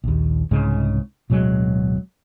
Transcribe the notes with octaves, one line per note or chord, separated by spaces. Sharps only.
A#1 D#2
C2 G#2 C#3 G#3
D1 B2 F#3 G#3